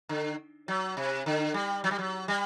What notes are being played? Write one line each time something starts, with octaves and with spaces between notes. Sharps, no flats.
D3
F#3
C3
D3
G3
F#3
G3
F#3
G3